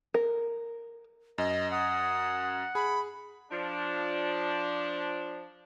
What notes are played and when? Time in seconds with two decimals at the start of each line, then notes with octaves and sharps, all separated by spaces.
0.14 A#4
1.38 F#2 D#5
1.72 F#5 D#6
2.75 G#4 B5
3.51 F3 D4